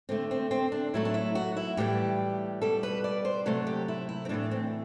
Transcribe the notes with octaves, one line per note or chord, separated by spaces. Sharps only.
D3 A3 C4
C4
C4
D4
A2 F#3 A3 E4
D4
E4
F#4
E4
A2 E3 G3 G4
B2 G3 A4
B4
D5
C5
C3 F#3 A3 A4
G4
E4
E4
C4
A2 E3 A3 D4
C4